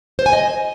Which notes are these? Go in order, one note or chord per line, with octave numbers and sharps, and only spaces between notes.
C5
G#5
D#5